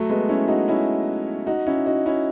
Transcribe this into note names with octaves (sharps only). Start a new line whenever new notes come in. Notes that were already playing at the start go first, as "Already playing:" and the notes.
Already playing: F#3 A3
G#3 B3
C#4 E4
D#4 F#4
C#4 E4
D#4 F#4
C#4 E4
D#4 F#4
C#4 E4